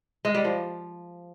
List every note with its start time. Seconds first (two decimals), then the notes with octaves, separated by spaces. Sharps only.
0.25 G#3
0.35 G3
0.44 F3